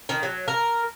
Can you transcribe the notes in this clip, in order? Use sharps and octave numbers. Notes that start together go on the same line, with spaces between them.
D#3
F#3
A#4